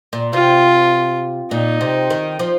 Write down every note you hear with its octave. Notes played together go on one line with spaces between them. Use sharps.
A#2
C3 F4
A#2 D#4
C3
D#3
F3